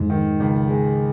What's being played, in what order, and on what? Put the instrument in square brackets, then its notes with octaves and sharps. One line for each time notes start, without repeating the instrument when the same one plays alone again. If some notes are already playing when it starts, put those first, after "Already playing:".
Already playing: [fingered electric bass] F2 [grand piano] G#2
[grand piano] D#3
C#2
G#3